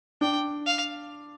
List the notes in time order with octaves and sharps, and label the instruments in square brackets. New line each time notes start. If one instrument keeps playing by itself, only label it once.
[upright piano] D4 [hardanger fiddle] G5
[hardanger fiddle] F5